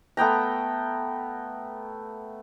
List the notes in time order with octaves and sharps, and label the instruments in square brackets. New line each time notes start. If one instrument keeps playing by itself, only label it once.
[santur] A3 B3 G5 A#5